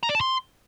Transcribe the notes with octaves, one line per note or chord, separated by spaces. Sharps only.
A#5
D5
A5
C6